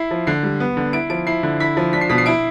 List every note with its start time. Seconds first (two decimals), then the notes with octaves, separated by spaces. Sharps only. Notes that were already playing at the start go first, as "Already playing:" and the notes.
Already playing: E4 C7
0.11 F3
0.27 D3 C7
0.43 G3
0.60 B3
0.77 D3
0.93 E4 D7
1.10 F3 D7
1.27 E4 C7
1.43 D3
1.60 E4 B6
1.77 F3
1.93 D4 B6
2.01 C7
2.09 B2 B6
2.18 C7
2.26 E4 D7